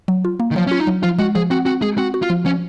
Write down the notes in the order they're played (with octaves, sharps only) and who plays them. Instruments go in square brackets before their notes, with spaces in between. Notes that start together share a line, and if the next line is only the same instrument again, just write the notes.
[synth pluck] F#3
F4
A#3
[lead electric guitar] D#3
[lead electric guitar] F3 [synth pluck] F#3
[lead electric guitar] C#4 [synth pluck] F4
[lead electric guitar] D#4
[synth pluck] F#3
[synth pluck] F3 [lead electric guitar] F4
[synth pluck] G#3 [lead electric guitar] F#4
[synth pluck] F3 [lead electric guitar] G#4
[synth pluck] C4 [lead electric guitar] F#4
[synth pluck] C4 [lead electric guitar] F#4
[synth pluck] G#3 [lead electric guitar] G#4
[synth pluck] C4 [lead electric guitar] F#4
[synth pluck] F#4
[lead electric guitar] F4
[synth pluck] F3
[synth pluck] F3 [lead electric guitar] C#4